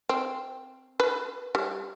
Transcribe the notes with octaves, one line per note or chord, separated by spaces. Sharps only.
C4
B4
G3